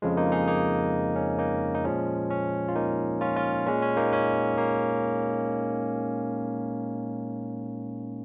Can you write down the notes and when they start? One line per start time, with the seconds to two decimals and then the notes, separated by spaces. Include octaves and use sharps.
0.02 F2 C#3 F3 G#3
0.17 A#3 D#4
0.32 D#4 G#4
0.48 A#3 D#4
1.16 C#4
1.39 A#3 D#4
1.75 D#4
1.85 A#2 F3 G#3 C#4
2.31 C#4
2.68 F4
2.75 A#3 D#4
3.21 C#4 F4
3.36 C#4 F4
3.66 A#2 G#3 C#4
3.82 C#4
3.97 A#3 D#4
4.13 C#4
4.58 A#3